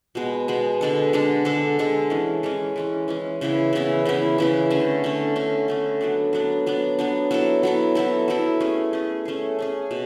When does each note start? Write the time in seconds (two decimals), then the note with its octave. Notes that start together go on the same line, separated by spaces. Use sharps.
0.15 B2 G#3 B3
0.48 B2 G#3 B3
0.81 D3 G#3 D4 A4
1.13 D3 G#3 D4 A4
1.45 D3 G#3 D4 A4
1.79 D3 G#3 D4 A4
2.10 E3 G#3 C#4
2.43 E3 G#3 C#4
2.76 E3 G#3 C#4
3.08 E3 G#3 C#4
3.41 C#3 E3 B3 E4
3.73 C#3 E3 B3 E4
4.05 C#3 E3 B3 E4
4.38 C#3 E3 B3 E4
4.70 D3 A3 C#4
5.04 D3 A3 C#4
5.36 D3 A3 C#4
5.68 D3 A3 C#4
6.01 F#3 B3 D4
6.33 F#3 B3 D4
6.66 F#3 B3 D4
6.99 F#3 B3 D4
7.31 F#3 B3 E4 A4
7.63 F#3 B3 E4 A4
7.95 F#3 B3 E4 A4
8.28 F#3 B3 E4 A4
8.60 A3 C#4 G#4
8.93 A3 C#4 G#4
9.25 A3 C#4 G#4
9.59 A3 C#4 G#4
9.91 B2